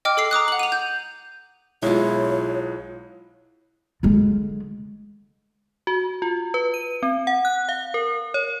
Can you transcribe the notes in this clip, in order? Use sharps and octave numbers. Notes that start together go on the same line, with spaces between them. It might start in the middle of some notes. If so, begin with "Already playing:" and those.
D#5 G5 D6 F6
A4 E6 C7
A#5 D6 D#6 F#6
F#5 F#7
D#7 F7
G6
B1 B2 G#3 E4 F4 C#5
D3 G#3
F#4
F4
B4
D#7
C4
F#5
F#6
F5
A#4
C#5